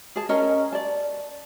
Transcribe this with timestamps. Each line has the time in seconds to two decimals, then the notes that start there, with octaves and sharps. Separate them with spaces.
0.16 G#4 A5
0.29 C#4 A#4 D#5 A#5
0.73 D5 A5